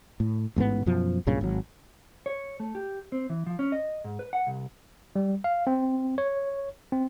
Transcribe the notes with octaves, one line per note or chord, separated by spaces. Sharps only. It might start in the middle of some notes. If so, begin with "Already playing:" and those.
A2
A1 G#2 A#3 B3
F#2 B2 F3
B1 G2 A#2 C#3
G#1 F#3
C#5
A3
G4
C4
E3
F3
C#4
D#5
G#2
B4
F#5
C2
G3
F5
C4
C#5
C4